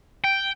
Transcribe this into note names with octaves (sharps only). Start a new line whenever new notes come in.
G5